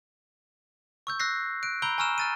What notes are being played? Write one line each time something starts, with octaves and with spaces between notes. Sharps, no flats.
C#6 E6 G6
E6 F#6 A#6 C7
F#6 D7
A#5 B5 E6 G6 D7 G7
G#5 A#5 C#6 E6 F6 E7
F6 A6 D#7